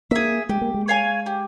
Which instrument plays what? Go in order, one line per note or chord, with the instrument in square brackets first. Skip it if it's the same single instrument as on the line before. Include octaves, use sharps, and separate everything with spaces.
[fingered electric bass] A#3 [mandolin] G#4 E5
[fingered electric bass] G#3 [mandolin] G4
[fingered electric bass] A#3
G#3
[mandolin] C#5 F5 G#5
G4